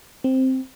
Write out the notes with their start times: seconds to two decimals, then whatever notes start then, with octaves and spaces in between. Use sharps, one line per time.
0.24 C4